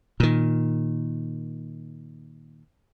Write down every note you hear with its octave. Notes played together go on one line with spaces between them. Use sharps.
A#2 D#3